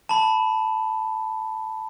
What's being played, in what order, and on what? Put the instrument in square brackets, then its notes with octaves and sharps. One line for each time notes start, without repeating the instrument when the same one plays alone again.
[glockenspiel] A5 B5